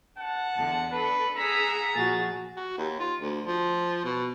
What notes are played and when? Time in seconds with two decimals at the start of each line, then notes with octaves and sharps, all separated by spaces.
0.18 F#5 A5
0.56 E2 D3
0.92 D4 A4 B4
1.37 G#4 F#5 A#5 E6 B6
1.95 A#2 F3 F#4 G#4 A6
2.57 F#4
2.78 D#2
3.00 F4
3.21 D2
3.46 F3
4.05 B2